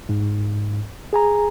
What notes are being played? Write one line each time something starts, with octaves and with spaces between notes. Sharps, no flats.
G#2
G#4 G#5 A#5